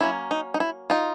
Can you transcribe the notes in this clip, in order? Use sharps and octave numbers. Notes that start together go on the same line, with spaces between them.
F#3 A#3 C#4 E4
D#4
D#4
E4
D#4 F4